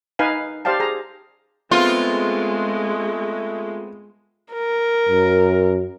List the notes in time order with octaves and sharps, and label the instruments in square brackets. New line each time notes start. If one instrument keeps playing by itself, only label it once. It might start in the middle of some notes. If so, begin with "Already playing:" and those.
[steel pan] D#4 B4 F5 G#5
G4 C5 D5 F5 G5 A5
G#4 A#5
[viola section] G#3 [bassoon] A3 [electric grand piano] B3 C4 [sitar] F4
[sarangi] A#4
[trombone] F#2